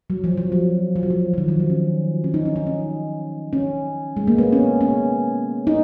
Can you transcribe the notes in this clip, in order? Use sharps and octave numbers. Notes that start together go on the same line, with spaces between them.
F#3
F3
F3
F#3
F3
F#3
F3
F3
D#3
F3
F#3
C#4
C#4
D#4
C#4
D#4
C#4
C#4
G#3
A#3
B3
C#4
C#4
D#4